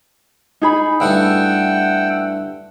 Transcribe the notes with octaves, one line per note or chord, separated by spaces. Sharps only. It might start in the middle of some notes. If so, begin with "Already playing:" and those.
D#4 G#4 B5
G2 A3 E4 F#5 G5 E6